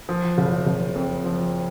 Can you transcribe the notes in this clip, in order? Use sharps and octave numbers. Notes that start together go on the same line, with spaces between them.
F3
F#1
F#1
F2
F3